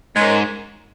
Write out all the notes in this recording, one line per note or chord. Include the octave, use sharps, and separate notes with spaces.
G#2 G#3 C#4 A#4